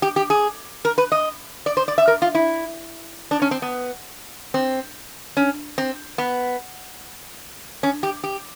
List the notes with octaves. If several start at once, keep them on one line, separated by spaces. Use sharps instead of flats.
G4
G4
G#4
A#4
B4
D#5
D5
C5
D5
E5
A#4
F4
E4
D4
C#4
C4
B3
C4
C#4
C4
B3
C#4
G4
G4